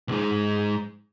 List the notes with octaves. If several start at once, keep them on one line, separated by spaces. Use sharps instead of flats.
B1 G#2